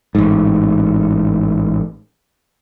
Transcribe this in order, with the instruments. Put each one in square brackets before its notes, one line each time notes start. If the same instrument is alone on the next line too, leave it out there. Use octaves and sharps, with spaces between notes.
[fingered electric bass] A1 G#2